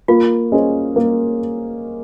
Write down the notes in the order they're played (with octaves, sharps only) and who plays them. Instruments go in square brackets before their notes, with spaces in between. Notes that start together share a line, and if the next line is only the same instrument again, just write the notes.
[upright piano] A#3 [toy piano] F4
[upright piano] C#4 G#4 C5 D#5
A#3